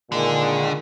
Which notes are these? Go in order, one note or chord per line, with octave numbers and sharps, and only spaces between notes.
A#2 D3 D#3 G#3